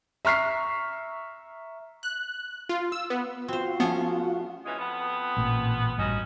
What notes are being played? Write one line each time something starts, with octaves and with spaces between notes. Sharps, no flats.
E5 A#5 C#6 F6 B6 C7
F#6
F4
E6
B3
C4 F4 F#4 C5
F3 A3 B3 C#4
E3 G#3 C#4
F2 B3
A1 A#2
A1 G2 C#4 D#4 F#4